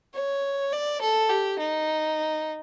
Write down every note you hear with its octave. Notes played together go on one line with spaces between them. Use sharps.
C#5
D5
A4
G4
D#4